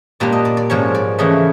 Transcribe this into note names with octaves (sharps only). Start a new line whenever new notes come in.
A#2 G3 A#3 D4 D5
D#5
D5
D5
G#2 F3 A#3 C#4 C#5
D5
C#3 E3 A3 D#5